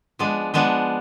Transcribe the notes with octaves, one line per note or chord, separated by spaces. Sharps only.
F3 G#3 B3 D4
F3 G#3 B3 D4